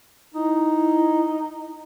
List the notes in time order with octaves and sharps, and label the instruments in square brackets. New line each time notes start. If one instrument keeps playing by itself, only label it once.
[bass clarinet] D#4 [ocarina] E4